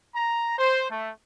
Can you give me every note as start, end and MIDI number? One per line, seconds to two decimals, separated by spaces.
0.15 0.55 82
0.59 0.89 72
0.91 1.11 57